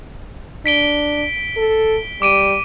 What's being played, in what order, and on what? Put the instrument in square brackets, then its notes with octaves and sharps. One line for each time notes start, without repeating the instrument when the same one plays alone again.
[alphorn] D4 [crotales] B6 D7 G7
[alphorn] A4
[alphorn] G3 [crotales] D6 D7 D#7